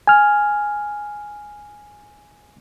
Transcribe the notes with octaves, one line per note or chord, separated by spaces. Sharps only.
G#5 F6